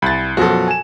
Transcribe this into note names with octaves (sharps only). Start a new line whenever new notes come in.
C2 B5 A6
F#2 B2 F3 F#4 A4
G#5 E7